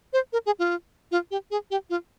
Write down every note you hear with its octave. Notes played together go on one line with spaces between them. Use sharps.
C5
A#4
G#4
F4
F4
G4
G#4
G4
F4